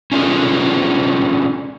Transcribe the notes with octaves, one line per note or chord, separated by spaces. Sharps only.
C#4 D4 F4 G#4 A4